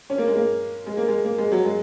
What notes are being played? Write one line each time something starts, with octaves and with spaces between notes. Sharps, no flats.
C#4
A#3
G#3
A#3
G#3
A#3
G#3
A#3
G#3
F#3
G#3